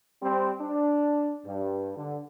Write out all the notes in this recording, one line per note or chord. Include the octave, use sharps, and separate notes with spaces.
G3 C4
D4
G2
D3